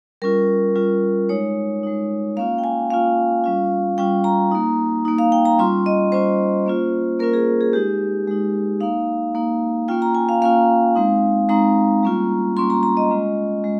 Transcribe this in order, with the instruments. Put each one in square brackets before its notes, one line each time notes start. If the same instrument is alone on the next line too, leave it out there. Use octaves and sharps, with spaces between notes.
[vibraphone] G3 C#4 F4 A#4
G3 C#4 F4
G#3 D#4 C#5
G#3 D#4
A#3 C#4 F4 F5
G5
G#5
A#3 C#4 F4 F5
G3 C#4 F4
G3 C#4 F4 G5
A#5
A#3 D#4
A#3 D#4
F5
G5
A#5
G3 C#4 F4 C6
D#5
G3 C#4 F4 C5
A#3 C#4 F4
A#3 C#4 F4 A#4
G#4
G#4
G#3 D#4 G4
G#3 D#4
A#3 D#4 F5
A#3 D#4
A#3 C#4 F4 G5
A#5
G#5
F5
A#3 C#4 F4 F5
G#3 C4 D#4
G#3 C4 D#4 A#5
G3 A#3 C#4 F4
G3 A#3 C#4 F4 C6
A#5
A#5
D#5
G#3 C#4 F4
G#3